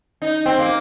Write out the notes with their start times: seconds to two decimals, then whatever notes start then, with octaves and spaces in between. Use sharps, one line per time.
0.22 D#4
0.46 C4
0.59 A#3